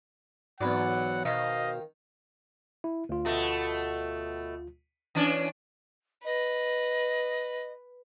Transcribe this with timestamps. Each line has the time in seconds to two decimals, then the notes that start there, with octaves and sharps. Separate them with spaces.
0.61 E2 G#2 F#3 B4 D5 F#5
1.25 B2 D#3 C5 D#5 F5
2.84 E4
3.09 D2 F4
3.25 B2 A3
5.15 E3 C#4 D4
6.25 B4 D#5